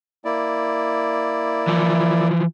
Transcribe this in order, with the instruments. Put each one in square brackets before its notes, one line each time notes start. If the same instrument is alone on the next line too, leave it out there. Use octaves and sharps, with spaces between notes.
[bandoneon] A#3 E4 D5
[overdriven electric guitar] E3 F3